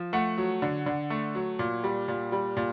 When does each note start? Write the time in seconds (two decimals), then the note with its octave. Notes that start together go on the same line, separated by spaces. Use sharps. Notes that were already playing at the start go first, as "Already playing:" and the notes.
Already playing: F3
0.13 A3 F#5
0.38 F#3
0.62 D3
0.86 D3
1.10 A3
1.35 F#3
1.59 A#2
1.84 G3
2.08 A#2
2.32 G3
2.57 A#2